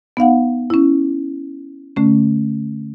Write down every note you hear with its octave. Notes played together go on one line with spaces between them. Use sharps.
B3 D#4 F5 F#5
C#4 E4
D3 A3 C#4